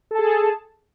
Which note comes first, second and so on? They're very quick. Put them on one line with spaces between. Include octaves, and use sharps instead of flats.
A4 A5 G#4